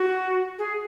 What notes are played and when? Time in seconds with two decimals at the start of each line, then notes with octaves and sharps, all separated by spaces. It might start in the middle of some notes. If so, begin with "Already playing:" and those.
Already playing: F#4
0.58 G#4